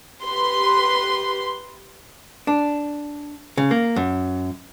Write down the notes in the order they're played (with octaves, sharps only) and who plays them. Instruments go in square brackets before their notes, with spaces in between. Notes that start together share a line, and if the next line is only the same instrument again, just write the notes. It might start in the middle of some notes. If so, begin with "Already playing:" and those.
[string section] G4 B4 C6
[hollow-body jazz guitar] D4
C#3
A#3
F#2